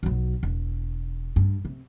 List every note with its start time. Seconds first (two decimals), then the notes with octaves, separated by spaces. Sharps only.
0.03 B1 F#3
0.43 E1
1.36 G2
1.65 C3